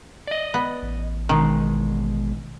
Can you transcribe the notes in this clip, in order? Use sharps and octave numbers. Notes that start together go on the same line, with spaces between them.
D5 D#5
B3
A1
B2 D#3 G#3